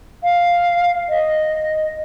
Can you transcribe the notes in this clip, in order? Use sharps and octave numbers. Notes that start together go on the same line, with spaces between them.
F5
D#5